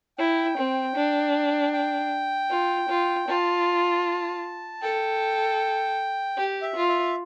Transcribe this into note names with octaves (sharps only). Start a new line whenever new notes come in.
E4 G5
C4
D4
G5
F4
F4
F4 A5
A4 G5
G4
E5
F4
E5